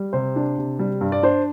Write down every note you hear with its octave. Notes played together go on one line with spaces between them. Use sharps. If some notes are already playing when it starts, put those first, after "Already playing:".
Already playing: G3
C3 C5
D4
C3
G3
G2
D5
D4 C5